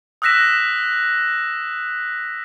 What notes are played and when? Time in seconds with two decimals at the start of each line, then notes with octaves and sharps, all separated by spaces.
0.22 D#6 E6 F#6 A#6 B6 E7